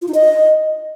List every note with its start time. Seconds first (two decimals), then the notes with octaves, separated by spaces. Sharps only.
0.02 F4
0.08 D#4
0.14 D#5